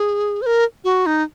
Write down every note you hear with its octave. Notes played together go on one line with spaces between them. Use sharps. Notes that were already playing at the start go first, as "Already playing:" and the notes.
Already playing: G#4
C5
A#4
F#4
D#4